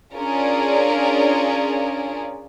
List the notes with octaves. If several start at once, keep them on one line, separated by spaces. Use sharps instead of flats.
C#4 D4 F4 G#4 A#4 D5